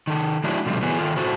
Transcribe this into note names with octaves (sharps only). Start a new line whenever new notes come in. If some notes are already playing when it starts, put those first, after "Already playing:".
D#3 A4
F3 G#3 D4 E4 F#4
B2 D3 F3 G3 A3
E3 F#3 B3 G#4
D#3 F4 A4
A2 A3 F#4 A4 C5 A5